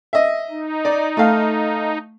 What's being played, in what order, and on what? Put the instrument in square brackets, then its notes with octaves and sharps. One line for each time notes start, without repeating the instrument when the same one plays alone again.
[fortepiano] D#5 E5
[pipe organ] D#4
[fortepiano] D5
A3 F5